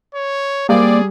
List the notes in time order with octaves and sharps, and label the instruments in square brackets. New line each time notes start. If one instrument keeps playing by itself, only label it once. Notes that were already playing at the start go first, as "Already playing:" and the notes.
[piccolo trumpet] C#5
[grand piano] G3 [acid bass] A#3 [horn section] C4 D5 [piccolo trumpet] G#4